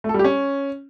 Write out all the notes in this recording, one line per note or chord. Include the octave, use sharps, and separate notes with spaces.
A3
A4
G3
G4
C#4